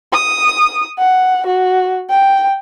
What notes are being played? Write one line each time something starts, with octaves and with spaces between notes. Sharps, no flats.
D#6
F#5
F#4
G5